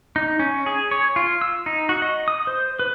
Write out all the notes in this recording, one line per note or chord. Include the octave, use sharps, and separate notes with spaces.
D#4
C#4
G#4
C#5
F4
E6
D#4
F#4
D#5
D#6
C5
B4